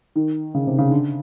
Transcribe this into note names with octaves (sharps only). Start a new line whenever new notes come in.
D#3
C#3
C3
C#3
D3